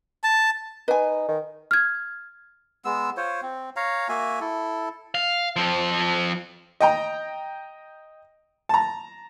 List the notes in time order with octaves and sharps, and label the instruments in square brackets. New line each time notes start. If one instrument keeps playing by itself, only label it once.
[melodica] A5
[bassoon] D#4 [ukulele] B4 G#5
[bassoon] D#3
[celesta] F6 G#6
[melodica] G#3 B3 E6
F4 C5 C#5
C4
C#5 F5 A#5
A#3 F#4 E5 G#5
E4 A4
[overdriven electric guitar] F5
F3 C4
[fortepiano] D#5 G5 A#5
A5 A#5